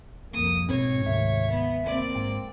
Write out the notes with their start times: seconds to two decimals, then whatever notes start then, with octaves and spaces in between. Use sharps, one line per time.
0.33 C2 F2 A#3 D#6
0.69 G#2 B2 C4 C#5
1.06 D2 C3 D#3 E5
1.50 B3
1.85 A#3 C4 D5
2.15 G#2 G5